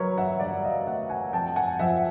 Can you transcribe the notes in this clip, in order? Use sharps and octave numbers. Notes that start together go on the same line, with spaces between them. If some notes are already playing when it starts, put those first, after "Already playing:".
Already playing: F#3 A#4 B4 C#5
E5 F#5
G2 D5 E5
D#5 F5
A3 E5 F#5
F#5 G#5
F2 G5 A5
F#5 G#5
F3 E5 F#5